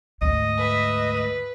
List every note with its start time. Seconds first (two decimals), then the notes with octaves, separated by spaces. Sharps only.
0.22 D2 G#2 D#5
0.57 B4 E5
1.14 B4